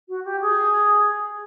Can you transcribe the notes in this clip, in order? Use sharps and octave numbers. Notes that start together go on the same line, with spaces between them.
F#4
G4
G#4